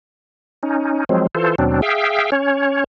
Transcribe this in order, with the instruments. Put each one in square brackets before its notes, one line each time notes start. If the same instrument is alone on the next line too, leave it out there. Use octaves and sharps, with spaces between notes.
[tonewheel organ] C#4 D#4
F3 F#3 G#3 C4
E3 F4 A4 C5
D#2 B2 F#3 C4 D4
G#4 E5 F5 G5
C#4 C#5